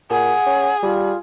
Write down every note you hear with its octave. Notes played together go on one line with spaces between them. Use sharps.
A#2 G#4 F#5
C#4
G3 F4